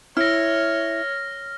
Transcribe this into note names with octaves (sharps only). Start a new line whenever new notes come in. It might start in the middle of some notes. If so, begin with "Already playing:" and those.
E4 C#5 F6 A#6